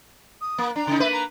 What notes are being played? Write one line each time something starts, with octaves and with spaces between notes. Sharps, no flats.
D#6
A#3
D4 A#5
C#3 D#4
A#3 B4 E5
A#5